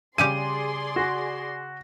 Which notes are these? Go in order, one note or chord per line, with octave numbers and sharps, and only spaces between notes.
C#3 G3 G4 G#4 D5 C6 D#7
F#4